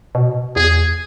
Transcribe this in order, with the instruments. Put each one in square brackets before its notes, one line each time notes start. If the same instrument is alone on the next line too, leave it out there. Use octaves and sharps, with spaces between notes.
[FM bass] B2
[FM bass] E2 [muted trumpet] G#4